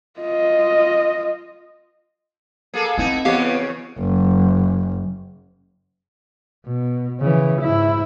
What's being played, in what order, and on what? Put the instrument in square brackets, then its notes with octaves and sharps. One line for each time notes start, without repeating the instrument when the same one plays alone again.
[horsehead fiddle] F4 D#5
[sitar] A#3 G#4 A4
[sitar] B3 D#4 E4 [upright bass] C4
[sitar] E2 C#3 C#5 [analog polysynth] B3 [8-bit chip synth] G4 F5
[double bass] F#1
B2
C#3 E3
G#2 E4